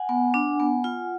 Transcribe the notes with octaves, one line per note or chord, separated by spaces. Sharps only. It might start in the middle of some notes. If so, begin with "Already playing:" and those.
Already playing: F#5 G#5
B3
D4
B3
F4